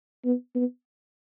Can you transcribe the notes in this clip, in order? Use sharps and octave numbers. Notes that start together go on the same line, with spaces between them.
B3
B3